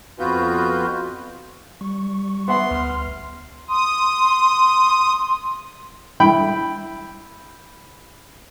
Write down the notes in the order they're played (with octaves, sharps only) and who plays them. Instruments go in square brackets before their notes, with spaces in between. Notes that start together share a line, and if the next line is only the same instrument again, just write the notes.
[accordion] F2 B3 F4 F#4 B4 G6
[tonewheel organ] G3 C#6
[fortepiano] B3 E5 F#5 [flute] C6
[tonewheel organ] D2 F6
[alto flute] C6 [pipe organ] D#6
[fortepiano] E4 G5 B5